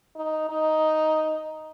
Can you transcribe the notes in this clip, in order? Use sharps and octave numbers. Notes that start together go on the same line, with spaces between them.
D#4
D#4